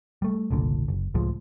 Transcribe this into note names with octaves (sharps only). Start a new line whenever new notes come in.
G3 A3
F#1 C2 A#2 D3
F#1
C#2 A2 F3 G#3